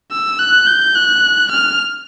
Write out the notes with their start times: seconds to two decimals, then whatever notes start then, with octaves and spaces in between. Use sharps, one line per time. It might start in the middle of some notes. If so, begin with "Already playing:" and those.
0.11 E6
0.39 F#6
0.67 G6
0.95 F#6
1.52 F6